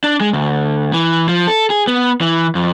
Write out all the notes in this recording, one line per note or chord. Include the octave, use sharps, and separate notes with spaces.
D4
G#3
D2
E3
F3
A4
G#4
B3
E3
F2